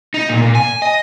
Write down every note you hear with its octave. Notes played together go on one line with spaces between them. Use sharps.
D#4
A#2
A#2
G#5
D#5